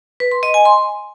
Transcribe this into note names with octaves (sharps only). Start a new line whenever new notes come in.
B4
C6
D#5
G#5
C6